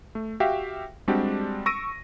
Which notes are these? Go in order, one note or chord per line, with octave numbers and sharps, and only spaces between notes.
A3
F#4 G4 E5 F5 G5
G3 G#3 C4 D4 F#4 G4
C#6 E6 A#6 D7 D#7